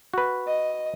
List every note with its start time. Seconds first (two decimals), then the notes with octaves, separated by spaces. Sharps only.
0.14 F#4 B4
0.47 D#5